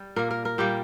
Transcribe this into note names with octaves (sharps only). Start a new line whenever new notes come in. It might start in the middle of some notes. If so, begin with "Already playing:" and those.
Already playing: G3
A#2 A#3 A#4
A#4
A#4
A#2 G3 A#3 G4